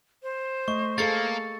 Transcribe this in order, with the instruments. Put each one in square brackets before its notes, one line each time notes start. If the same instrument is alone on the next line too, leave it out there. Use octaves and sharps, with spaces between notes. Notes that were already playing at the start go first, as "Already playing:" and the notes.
[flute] C5
[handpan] A3 D#5 [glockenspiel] C#6
[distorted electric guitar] A#3 [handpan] G#4 A4 F5 [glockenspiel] A6 C#7